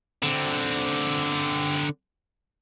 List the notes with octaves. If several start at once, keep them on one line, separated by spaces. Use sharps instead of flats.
D3 C4